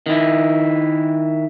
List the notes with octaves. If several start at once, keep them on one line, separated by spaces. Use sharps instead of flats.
D#3 E4